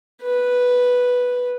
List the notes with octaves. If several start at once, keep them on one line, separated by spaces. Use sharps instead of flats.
B4